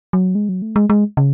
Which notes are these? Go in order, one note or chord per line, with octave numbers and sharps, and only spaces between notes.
F#3
G#3
F#3
A3
G#3
G#3
C#3